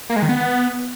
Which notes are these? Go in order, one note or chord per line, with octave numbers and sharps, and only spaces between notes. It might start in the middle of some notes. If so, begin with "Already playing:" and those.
A#3
G#3
D#3
B3